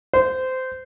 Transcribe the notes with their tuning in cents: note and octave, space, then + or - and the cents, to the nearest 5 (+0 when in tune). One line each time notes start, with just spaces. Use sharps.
C5 -20